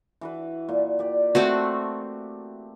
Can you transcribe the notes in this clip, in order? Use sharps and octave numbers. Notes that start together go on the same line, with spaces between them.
E3 F#4 B4
A#2
G4 D5
A3 C4 F#4 A5